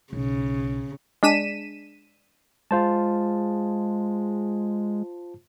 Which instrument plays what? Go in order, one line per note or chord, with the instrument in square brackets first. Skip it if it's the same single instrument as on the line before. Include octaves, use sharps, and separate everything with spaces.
[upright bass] B1 [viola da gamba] C#3
[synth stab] G#3 D4 B6 D#7 E7
[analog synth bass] G#3 [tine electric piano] F4 C5 A5